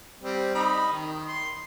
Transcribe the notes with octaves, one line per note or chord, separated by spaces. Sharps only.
G3 C4
D#4 B5
D#3
C6